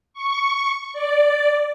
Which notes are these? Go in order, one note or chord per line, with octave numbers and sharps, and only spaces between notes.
C#6
D5